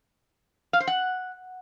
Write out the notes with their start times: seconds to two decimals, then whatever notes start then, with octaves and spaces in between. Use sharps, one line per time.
0.73 F5
0.80 C5
0.87 F#5